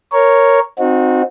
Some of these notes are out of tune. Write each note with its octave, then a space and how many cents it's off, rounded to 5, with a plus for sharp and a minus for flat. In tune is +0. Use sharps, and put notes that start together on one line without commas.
A#4 +0 C#5 +0
C4 +0 D#4 -15 F#4 -30